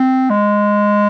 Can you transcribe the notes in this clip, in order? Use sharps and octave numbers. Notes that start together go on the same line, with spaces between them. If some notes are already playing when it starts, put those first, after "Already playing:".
Already playing: C4
G#3